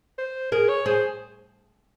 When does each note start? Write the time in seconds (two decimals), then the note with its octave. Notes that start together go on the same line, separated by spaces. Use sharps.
0.18 C5
0.52 G#4 A#4
0.69 C#5
0.86 G#4 C5